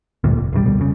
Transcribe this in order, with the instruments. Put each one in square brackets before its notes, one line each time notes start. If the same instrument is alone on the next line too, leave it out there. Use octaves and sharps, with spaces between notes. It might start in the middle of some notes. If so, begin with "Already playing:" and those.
[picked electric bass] D2 G2 A#2
F1
E1 A#1 C3 G3
D2 B2 G3
F1 C#3